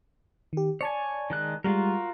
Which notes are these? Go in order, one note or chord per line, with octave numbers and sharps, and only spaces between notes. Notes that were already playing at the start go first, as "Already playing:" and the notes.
D#3 G4
C#5 D5 G#5 A5
D#3 G#3 F#6
G3 G#3 F4 F#4 A#4